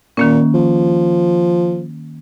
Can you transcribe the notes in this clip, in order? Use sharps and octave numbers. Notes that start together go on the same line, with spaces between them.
A#2 D#3 A#3 C#4
F3